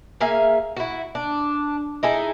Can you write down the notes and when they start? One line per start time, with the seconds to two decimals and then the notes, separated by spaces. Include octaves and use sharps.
0.21 A#3 G#4 E5 F5
0.76 E4 F#4
1.15 D4
2.03 D#4 E4 G#4 A4